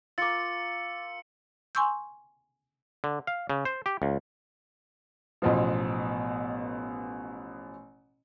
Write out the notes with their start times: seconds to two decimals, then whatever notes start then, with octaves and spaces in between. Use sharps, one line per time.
0.18 F4 A#4 D6 E6 A6 C#7
1.75 G#5 C6 C#6 E6 G6
3.04 D3
3.27 F5
3.50 C#3
3.65 C5
3.86 G4
4.02 C#2
5.42 A1 B2 F3